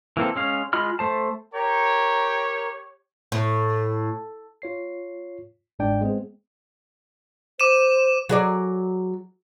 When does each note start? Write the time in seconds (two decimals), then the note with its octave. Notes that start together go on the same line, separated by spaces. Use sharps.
0.17 E3 A#3 C4 A4
0.36 G#3 C#4 F5
0.73 G#3 F4 D#5 B5 F6
0.99 A3 C5 A5
1.54 G4 A#4 C#5 G5 A#5
3.32 A2
4.62 F4 C#5 C7
5.79 G1 G#2 G#3 D4 D5 G5
6.01 G#3 B3 C4 G#4
7.60 C5 D6 D#7 E7
8.29 F#3 G#4 D5